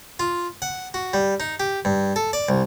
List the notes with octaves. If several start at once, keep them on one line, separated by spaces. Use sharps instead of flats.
F4
F#5
F#4
G3
D#4
G4
G2
A4
D5
C2